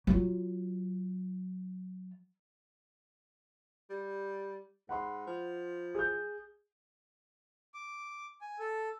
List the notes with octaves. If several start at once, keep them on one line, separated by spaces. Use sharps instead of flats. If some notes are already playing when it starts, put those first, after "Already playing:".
F#3 F4
G3
G#2 F#5 B5 C6
F3
G#4 G6
D6
G#5
A4